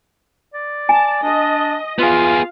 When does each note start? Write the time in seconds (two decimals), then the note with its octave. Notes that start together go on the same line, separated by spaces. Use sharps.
0.54 D5
0.89 G#5 A5
1.23 D4 D#5
1.99 B3 F4 G#4 F5